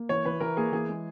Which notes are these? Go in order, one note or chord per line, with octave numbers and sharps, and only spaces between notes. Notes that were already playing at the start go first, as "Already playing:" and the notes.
Already playing: A#3
E3 C#5
E3 B4
E3 A#4
A#3 G#4
E3 G#4
G#3